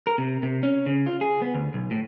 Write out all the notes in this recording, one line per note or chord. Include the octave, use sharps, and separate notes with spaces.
A#4
C3
C3
C#4
C#3
F4
G#4
B3
D2
B1
A2